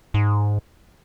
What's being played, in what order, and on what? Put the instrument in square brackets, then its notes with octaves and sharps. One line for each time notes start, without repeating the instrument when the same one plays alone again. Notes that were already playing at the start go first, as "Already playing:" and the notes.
[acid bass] G#2